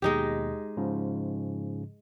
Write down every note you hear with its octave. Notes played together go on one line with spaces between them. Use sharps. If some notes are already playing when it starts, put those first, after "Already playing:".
D#2 B2 G#3 D#4 G4
G#2 C#3 F3